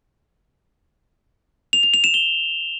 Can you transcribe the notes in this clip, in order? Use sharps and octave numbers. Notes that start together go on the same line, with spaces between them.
F7
F7
F7
E7
G7